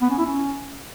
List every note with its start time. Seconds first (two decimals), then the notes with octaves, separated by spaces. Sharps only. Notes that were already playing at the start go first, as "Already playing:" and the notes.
0.02 B3
0.10 C#4
0.18 E4
0.26 C#4